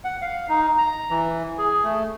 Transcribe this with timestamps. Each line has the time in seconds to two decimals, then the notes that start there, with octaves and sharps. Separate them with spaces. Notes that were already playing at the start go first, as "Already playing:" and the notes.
0.04 F#5
0.22 F5
0.49 D#4
0.78 A#5
1.10 E3
1.58 G#4
1.84 A3